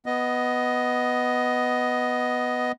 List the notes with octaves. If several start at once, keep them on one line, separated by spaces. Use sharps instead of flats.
B3 D#5